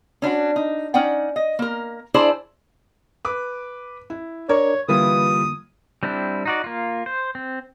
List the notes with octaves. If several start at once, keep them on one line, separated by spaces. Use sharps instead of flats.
C#4 D4 E4 F#4
D#4
C#4 D#4 D5 F#5 G5
D#5
A#3 A#4
D4 E4 G#4 C5 D5 E5
B4 D6
E4
D4 A#4 C#5 D5 G#6
D3 E3 G3 A#3 F4 B4 D#6
G3 C4 D4 E4
D#4 F#4 D5
A#3 F4
C5
C4